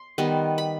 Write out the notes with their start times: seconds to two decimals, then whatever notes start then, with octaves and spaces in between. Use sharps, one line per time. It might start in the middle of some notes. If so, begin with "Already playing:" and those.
Already playing: C6
0.18 D#3 G3 B3
0.58 B5